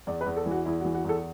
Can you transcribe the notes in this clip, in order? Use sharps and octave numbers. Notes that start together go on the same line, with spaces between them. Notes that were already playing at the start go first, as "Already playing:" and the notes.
E2 D5
B4
E2
A4
E3
F#4
E2 E4
F#4
E3
F#4
E2 A4